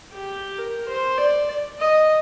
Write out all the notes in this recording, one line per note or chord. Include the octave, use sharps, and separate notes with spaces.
G4
A#4
C5
D5
D#5